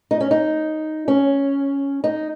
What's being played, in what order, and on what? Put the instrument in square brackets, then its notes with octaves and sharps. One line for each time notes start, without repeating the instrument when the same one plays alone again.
[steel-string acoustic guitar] D#4
C#4
D#4
C#4
D#4